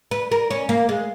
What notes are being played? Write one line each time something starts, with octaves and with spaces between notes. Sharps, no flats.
B4
A#4
C#4
A#3
G#3